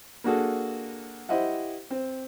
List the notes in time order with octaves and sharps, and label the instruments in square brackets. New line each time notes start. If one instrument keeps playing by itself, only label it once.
[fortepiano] A#3 D4 F#4 G#4 A4
E4 G4 C5 D#5 E5 F#5
C4